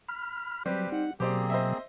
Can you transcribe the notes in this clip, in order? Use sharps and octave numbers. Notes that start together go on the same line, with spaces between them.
B5 F6
F#3 G3 C4 G4 B4
D#4 F#5
B2 F#3 A#3 C4 G4 G#4 C5 D5
C5 D#5 E5